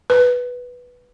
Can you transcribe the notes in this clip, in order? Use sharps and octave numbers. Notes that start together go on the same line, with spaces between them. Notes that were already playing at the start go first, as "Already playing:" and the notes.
B4